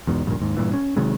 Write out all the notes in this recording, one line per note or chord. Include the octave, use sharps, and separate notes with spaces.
E2 G#2 B2
D1 A#1 G2 A#2
D#2 G#2
G2 A#2 E3
C#4
C3 D#3 F#3 G#3